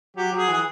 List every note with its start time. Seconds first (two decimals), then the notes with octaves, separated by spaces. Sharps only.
0.17 F#3 G4
0.32 F#3 G#4
0.48 E3 G#4